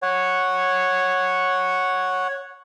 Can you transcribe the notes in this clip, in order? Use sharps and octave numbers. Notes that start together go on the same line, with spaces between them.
C#5 F#5